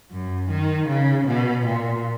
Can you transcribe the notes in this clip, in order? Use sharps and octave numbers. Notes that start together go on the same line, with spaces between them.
F#2
D#3
C#3
B2
A#2